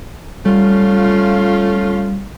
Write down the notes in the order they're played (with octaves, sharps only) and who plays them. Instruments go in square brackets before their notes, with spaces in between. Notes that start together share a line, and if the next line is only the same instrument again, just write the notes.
[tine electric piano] G3 [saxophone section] A3 C#4 F4